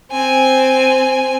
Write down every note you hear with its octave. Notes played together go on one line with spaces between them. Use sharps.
C4 G#5